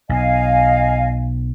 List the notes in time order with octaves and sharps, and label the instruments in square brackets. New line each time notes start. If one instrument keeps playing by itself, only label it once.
[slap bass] B1 [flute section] D#5 F5 G#5